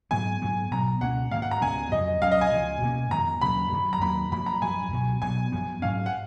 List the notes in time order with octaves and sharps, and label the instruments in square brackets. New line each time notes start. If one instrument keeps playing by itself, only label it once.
[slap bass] G#2 F#3 B3 [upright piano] G#5
[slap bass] G#2 F#3 B3
[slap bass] B2 F#3 B3 [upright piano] A#5
[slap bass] C#2 B2 A#3 C#4 [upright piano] F#5
[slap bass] G#2 D#3 A#3 [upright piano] F5
[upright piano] F#5
A#5
[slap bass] C#2 C#3 G#3 B3 [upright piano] G#5
[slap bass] F2 C#3 F#3 [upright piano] D#5
[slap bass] C#2 C#3 F#3 C#4 [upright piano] F5
[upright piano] D#5
G#5
[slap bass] C#2 C#3 F3
B2 A#3 C#4
[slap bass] F2 D#3 G#3 B3 [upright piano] A#5
[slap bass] D#2 C#3 F#3 A#3 [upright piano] B5
[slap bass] F#2 D#3 F#3
[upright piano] A#5
[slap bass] D#2 D#3 F#3 A#3 [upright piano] B5
[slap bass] F#2 F3 A#3 [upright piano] B5
[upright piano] A#5
[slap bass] F#2 F3 G#3 [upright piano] G#5
[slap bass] C#2 B2 F#3
[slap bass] B2 F#3 B3 [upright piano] G#5
[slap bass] F#2 F3 B3
[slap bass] G#2 F#3 C#4 [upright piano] F5
[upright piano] F#5